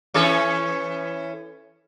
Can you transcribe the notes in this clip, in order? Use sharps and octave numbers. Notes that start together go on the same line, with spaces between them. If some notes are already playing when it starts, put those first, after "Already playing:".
E3 C#4 A4